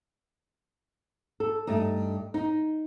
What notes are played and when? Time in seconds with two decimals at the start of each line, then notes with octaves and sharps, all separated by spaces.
1.40 A4
1.67 G2 A3 D#4
2.34 D#4